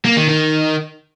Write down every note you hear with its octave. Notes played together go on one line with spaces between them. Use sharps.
A#3
D#3
D#3